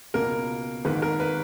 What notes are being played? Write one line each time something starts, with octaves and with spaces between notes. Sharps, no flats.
C#2 B2 A#3 A#4
G#1 G#2 D#3 A#3 B4
A#4
B4